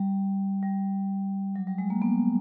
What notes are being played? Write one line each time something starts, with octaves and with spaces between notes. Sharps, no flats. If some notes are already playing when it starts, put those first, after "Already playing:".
Already playing: G3
G3
F#3
G3
G#3
A#3
B3